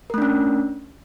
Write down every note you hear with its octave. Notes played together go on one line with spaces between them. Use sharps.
A3 C#4 D4 A#4